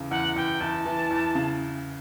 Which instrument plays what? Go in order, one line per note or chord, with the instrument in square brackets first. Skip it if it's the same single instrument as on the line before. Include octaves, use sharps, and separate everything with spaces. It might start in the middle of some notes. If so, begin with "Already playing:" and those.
Already playing: [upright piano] E2 C#3
[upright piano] E2 [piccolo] F#5
[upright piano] E2 [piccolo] G5
[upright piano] E2 [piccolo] A5
[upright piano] E3
E2
C#3